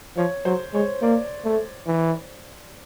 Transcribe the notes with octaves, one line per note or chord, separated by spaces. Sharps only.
F3 C#5
F#3 C5
G#3 C#5
A#3 D5
A3
E3